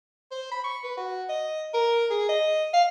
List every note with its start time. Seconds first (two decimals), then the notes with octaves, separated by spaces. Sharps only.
0.31 C5
0.51 B5
0.64 C#6
0.84 B4
0.97 F#4
1.29 D#5
1.74 A#4
2.11 G#4
2.29 D#5
2.74 F5